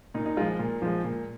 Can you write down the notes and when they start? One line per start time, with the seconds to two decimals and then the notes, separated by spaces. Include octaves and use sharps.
0.14 A#2 D#4
0.26 D#4
0.37 F3 G#3 F4
0.59 A#2
0.82 F3 G#3
1.04 A#2